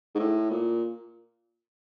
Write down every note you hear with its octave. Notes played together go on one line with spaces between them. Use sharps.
G#2
A2
A#2